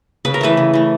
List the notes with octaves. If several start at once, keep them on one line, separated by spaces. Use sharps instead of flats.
C#3 B4
A#4
E3 A3 B4
C#3
E3 A3